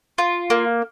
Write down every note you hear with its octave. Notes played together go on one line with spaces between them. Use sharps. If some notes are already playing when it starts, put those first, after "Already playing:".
F4
A#3